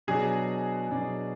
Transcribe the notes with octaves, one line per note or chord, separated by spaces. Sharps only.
B2 F#3 D4 G#4
B2 F#3 D4